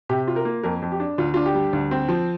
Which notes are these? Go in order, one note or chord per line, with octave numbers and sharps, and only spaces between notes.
C3 G4
F4
A#4
A#3
F2 A#4
F2
G4
D4
D2 F4
D4 F4
G4
G3
D2
C4
F3